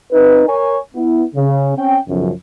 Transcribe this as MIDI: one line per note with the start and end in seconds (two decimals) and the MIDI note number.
0.12 0.43 60
0.12 0.43 63
0.12 0.43 71
0.47 0.78 70
0.47 0.78 73
0.47 0.78 80
0.95 1.24 59
0.95 1.24 64
1.35 1.73 49
1.77 1.98 60
1.77 1.98 61
1.77 1.98 79
2.08 2.31 35
2.08 2.31 42
2.08 2.31 49
2.08 2.31 53